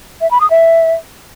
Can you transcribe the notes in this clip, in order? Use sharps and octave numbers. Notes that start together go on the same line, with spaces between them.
E5
B5
D#6
E5